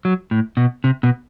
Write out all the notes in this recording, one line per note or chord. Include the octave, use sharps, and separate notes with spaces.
F#3
A2
B2
C3
B2